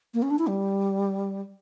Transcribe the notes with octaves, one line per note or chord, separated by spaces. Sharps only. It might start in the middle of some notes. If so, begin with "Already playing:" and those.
A#3
C#4
D4
E4
G3